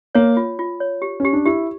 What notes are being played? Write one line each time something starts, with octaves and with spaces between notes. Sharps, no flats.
A#3 C#5
F4
F4
C#5
G4
C#4 G4
D4
E4 G4